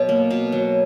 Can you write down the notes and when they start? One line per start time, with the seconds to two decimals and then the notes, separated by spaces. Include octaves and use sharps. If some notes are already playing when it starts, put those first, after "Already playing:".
Already playing: B2 F#3
0.09 A#3
0.30 B2
0.52 F#3